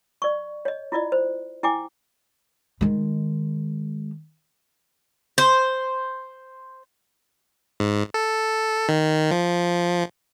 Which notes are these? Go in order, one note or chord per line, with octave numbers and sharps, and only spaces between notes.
D5 C#6
C#5 D#5
E4 F4 D5 D#5
C5
E4 G5 G#5 D6
D#3 G#3
C5
G#2
A4
D#3
F3